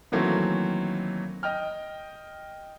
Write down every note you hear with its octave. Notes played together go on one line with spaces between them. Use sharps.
D#3 E3 F#3 A3 A#3 C4
D#5 G5 F6